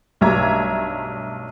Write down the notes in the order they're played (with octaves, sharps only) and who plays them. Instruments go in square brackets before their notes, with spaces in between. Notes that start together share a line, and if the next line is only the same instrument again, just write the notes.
[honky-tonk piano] B1 G2 A3 E5 A#5 G#6